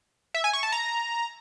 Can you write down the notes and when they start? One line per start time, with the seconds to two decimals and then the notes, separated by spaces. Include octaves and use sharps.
0.34 E5
0.44 G#5
0.53 C#6
0.63 A5
0.72 A#5